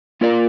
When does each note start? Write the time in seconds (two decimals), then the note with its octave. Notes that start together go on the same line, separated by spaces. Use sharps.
0.21 A#3 F4 A#4 D5